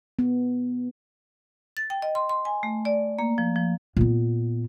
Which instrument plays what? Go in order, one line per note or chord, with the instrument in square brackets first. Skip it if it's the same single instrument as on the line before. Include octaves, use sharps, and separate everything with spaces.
[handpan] B3
[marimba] A6
G5
D#5
C6
C6
G#5
A3
D5
A#3
F3
F3
[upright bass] A#2 B3